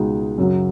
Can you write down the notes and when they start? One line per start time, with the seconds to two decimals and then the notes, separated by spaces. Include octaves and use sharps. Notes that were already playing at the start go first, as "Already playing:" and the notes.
Already playing: C#2 B2 G#3 D#4
0.38 F#2 C#3 F#3